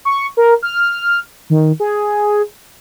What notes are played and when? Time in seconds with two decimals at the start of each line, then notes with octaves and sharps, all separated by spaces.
0.05 C#6
0.37 A#4
0.62 F6
1.50 D#3
1.80 G#4